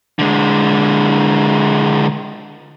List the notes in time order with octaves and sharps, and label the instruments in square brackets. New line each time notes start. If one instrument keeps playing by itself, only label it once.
[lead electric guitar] D3 G#3